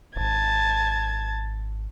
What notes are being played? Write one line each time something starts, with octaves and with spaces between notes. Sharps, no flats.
D1 G#1 A5 G#6